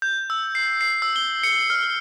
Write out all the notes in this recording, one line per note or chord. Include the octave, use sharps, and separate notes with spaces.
G6
E6
C7
C7
E6
G7
C#7
F6